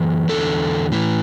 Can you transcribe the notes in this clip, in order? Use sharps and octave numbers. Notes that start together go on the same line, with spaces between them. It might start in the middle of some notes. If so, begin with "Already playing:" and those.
Already playing: F#2 E3
E2 D3 A4
A2 E3